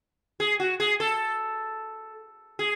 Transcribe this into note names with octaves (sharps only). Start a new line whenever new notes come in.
G#4
F#4
G#4
A4
G#4